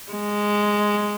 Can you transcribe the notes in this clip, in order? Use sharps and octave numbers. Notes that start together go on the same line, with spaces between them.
G#3